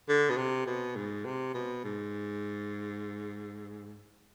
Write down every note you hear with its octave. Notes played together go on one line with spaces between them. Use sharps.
D3
B2
C3
B2
G#2
C3
B2
G#2